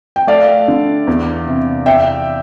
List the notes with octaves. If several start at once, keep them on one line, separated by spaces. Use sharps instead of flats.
G5
A3 D5 F5
D3
E2
C3
E2 E5 G5